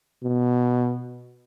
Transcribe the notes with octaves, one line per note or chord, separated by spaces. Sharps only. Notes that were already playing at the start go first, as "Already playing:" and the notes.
B2